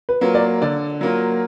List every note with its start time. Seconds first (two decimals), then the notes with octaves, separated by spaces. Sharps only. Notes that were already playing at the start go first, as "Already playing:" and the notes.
0.09 B4
0.21 F#3 A#3 F4
0.35 D5
0.62 D3 D5
1.01 F#3 A#3 F4